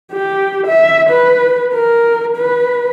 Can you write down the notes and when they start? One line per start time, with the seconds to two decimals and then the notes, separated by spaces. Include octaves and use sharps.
0.12 G4
0.67 E5
1.10 B4
1.74 A#4
2.37 B4